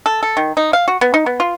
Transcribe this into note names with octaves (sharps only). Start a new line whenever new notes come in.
A4
A4
D#3
D#4
F5
F#4
B3
D#4
B3
F4